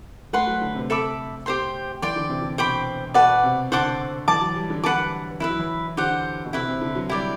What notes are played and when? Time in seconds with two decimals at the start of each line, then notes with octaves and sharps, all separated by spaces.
0.33 A3 B4 F#5 C6
0.47 F#3
0.61 D3
0.75 C3
0.90 A4 E5 B5 D6
1.46 G4 C5 G5 C6
2.02 E3 D5 G5 C6
2.16 D3
2.29 C3
2.42 D3
2.58 B2 C5 G5 B5 D6
3.14 B2 B4 D5 F#5 A5
3.43 C3
3.72 D3 C5 F#5 A5 D6
4.28 E3 D5 A5 D6
4.41 F#3
4.56 G3
4.70 D3
4.84 D3 B4 F#5 A5 D6
5.40 E3 E4 B4 E5
5.50 F#3
5.59 E3
5.97 D3 G4 C5 F#5
6.45 B2
6.53 C3 E4 B4 E5
6.68 C3
6.82 D3
6.95 F#3
7.09 G3 E4 G4 D5